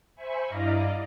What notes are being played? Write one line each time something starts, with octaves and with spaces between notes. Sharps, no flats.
C5 E5 G#5 B5 C#6
G2 E4 D5 D#5 F5 A#5